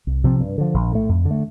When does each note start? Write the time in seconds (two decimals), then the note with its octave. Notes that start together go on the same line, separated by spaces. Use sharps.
0.07 C2
0.24 C3 F3 C4
0.40 G2
0.58 D3 F3
0.74 A#1
0.92 A2 A3
1.09 F2
1.25 D3
1.31 A3